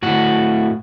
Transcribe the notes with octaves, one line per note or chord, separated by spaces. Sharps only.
A2 F#4